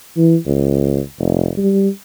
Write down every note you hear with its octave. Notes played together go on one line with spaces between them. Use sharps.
E3
C#2
F1
G3